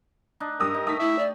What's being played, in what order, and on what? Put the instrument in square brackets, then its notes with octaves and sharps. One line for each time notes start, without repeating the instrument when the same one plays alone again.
[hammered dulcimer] D4 D#4
[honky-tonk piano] G2 D#6 E6 [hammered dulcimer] G4 [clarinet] A#4
[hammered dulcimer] D#4
[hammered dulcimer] A3 [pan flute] D#4 [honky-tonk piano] D#6 B6
[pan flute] E4 [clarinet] E5
[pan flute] D5